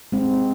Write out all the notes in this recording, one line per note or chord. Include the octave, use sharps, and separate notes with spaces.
G#3 C4